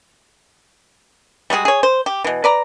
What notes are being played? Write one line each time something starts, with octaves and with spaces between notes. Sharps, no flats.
G3 G#3 F#4 G#4
G#4 C#5
C5
G4
B2 E3
B4 D5 A#5